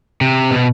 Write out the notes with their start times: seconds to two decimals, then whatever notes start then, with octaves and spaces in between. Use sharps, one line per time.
0.21 C3
0.51 B2